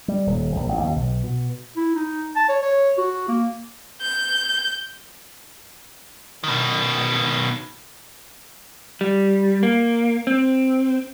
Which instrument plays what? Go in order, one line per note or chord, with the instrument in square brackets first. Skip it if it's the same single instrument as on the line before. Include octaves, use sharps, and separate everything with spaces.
[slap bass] G3
D#1
A#1
A1
D#2
B1
B2
[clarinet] E4
D#4
A5
C#5
C#5
F#4
A#3
[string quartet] G6
[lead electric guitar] B2 D#3
[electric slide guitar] G3
A#3
C4